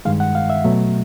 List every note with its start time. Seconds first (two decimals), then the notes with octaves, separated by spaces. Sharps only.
0.05 G2 D#3 G#3 F5
0.20 F#5
0.35 F5
0.50 E5
0.65 B2 F#3 A3